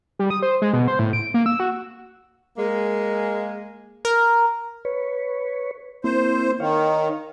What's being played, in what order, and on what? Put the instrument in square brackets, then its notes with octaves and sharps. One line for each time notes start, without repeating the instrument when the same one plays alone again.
[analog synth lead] G3
D#6
C5
G#3
B2
C5
A2
D7
A#3
E6
F#4
[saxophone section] G#3 A#3
[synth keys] A#4
[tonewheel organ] B4 C#5
[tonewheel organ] A#3 C4 E4 [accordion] C5
[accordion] D#3 [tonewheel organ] C#5 F5